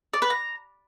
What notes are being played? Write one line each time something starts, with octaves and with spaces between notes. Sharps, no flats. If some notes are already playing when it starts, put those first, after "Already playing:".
D5
B4
A#5